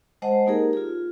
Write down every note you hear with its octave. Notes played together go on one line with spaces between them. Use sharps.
G#3 C5 D#5 F#5 A5
A#3 D#4 G4 G#4 A#4
F4 G#4